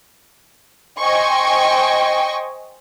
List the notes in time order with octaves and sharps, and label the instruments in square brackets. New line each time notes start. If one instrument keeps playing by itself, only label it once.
[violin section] C5 D#5 G5 G#5 C#6